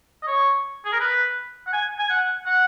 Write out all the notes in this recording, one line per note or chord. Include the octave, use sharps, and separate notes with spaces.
D#5
C#5
G#4
A#4
B4
F#5
G#5
G#5
F#5
F#5